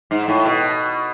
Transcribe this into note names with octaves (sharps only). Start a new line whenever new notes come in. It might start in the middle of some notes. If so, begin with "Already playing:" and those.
G#2
A2
B2